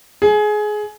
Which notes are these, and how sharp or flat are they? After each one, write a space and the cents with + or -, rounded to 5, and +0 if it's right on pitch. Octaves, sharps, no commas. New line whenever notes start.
G#4 +20